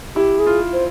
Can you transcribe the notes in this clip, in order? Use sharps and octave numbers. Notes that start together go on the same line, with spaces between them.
E4 G4
G#4
F4
C5